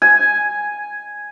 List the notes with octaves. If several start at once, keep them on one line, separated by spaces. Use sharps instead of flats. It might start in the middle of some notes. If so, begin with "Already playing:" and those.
G#5